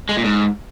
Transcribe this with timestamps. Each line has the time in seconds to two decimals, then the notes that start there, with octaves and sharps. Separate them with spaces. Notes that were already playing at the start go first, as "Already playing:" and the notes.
0.09 G#3
0.17 A#2
0.24 G#2